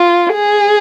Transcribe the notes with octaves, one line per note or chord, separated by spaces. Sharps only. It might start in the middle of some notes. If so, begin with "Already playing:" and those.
Already playing: F4
G#4